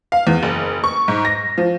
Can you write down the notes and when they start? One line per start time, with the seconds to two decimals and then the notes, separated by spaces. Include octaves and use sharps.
0.12 F5
0.27 E2
0.43 F#1
0.84 C#6
1.08 G#2
1.25 A#6
1.58 F3